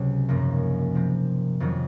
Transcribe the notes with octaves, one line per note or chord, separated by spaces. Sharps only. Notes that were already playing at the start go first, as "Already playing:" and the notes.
Already playing: C#2 C3 F#3
G#1 F#2 F3 A#3
C3 F3 C4
F2 C3 D#3 F#3